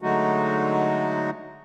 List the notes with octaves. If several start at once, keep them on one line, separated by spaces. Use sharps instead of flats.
D3 F#3 G#3 A3 D#4 F#4